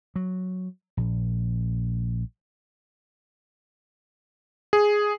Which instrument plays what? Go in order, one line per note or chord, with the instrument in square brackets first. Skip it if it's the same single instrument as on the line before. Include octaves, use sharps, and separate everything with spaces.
[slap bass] F#3
A#1
[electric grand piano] G#4